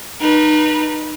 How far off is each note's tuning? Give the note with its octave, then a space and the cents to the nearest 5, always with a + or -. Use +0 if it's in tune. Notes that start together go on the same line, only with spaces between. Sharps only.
D#4 -25 B4 -30